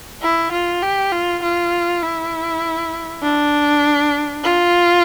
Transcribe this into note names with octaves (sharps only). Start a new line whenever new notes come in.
E4
F4
G4
F4
F4
E4
D4
F4